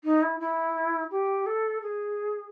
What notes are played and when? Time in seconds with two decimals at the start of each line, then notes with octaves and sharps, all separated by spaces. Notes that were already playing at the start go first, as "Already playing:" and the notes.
0.04 D#4
0.22 E4
0.40 E4
1.11 G4
1.46 A4
1.82 G#4